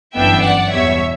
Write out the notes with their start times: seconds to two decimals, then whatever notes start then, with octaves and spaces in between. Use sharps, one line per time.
0.15 G1 F#2 E3 B3 D4 E5 G5
0.43 D5 F#5
0.71 E2 B2 G3 C#5 E5